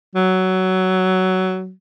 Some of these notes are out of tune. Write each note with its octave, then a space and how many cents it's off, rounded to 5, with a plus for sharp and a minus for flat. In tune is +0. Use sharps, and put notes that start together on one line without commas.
F#3 +15